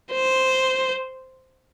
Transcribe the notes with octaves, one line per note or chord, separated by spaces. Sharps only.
C5